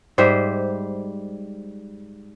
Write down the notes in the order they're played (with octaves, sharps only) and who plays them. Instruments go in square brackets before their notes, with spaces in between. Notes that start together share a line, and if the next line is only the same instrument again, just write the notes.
[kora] G#2 G3 C5 E5